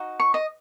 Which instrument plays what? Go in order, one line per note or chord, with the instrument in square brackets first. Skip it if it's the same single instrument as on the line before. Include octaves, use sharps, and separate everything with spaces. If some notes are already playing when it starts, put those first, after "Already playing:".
Already playing: [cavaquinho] D#4 F#4
C#6
D#5